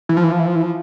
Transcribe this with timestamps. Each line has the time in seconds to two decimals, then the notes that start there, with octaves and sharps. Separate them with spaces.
0.09 E3
0.17 F3
0.24 E3
0.32 F3
0.39 E3
0.47 F3
0.55 E3
0.62 F3